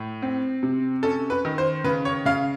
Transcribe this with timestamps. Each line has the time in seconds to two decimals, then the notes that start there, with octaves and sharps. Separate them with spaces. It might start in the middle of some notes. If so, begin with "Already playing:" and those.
Already playing: A2
0.22 C4
0.63 C3
1.03 C#4 A4
1.30 B4
1.45 D#3
1.58 C5
1.84 C#3 B4
2.05 C#5
2.25 C#3 F5